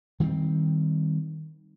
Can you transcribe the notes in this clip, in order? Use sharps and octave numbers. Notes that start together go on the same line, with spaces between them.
D#3 G3 A3 C4